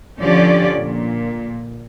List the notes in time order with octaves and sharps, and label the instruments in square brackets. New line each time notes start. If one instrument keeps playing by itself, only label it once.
[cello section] D3 F3 C#4 G4 D5
A#2